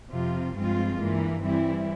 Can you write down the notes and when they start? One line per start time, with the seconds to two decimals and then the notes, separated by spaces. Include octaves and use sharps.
0.10 F2 C3 F3 C4 F4
0.55 G2 F3 G#3 C4 F4
0.99 G2 E3 A#3
1.43 E3 G3 C4 E4